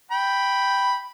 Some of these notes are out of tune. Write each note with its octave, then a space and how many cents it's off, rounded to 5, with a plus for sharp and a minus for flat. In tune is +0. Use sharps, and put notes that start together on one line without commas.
G5 +0 B5 +0